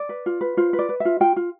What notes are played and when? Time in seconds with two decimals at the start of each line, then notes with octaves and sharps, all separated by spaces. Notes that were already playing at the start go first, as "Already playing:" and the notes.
Already playing: D5
0.09 B4
0.26 F4
0.41 B4
0.57 F4 C5
0.73 B4
0.79 D5
0.89 B4
1.00 E5
1.05 F4
1.20 F4 G5
1.36 F4